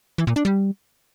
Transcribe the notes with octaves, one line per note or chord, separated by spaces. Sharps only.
E3
A#2
D4
G3